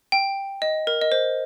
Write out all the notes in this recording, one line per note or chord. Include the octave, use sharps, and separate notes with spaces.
G5
D#5
A#4
D#5
C5